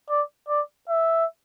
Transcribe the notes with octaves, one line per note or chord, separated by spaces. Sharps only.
D5
D5
E5